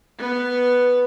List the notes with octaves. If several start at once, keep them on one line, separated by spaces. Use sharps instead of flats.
B3 B4